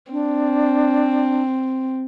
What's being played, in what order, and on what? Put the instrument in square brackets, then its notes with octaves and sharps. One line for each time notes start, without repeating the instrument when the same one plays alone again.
[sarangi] C4 [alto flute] D4